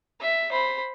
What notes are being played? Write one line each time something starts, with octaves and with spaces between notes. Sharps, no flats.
E5
C5 B5